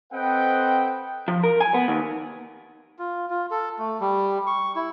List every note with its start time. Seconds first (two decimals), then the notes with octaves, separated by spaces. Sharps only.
0.13 C4 A4 B4 D#5 F#5 G5
1.28 F3
1.43 A#4
1.60 G#5
1.74 B3
1.88 D#2
2.99 F4
3.30 F4
3.51 A4
3.79 A3
4.00 G3
4.47 C#6
4.76 E4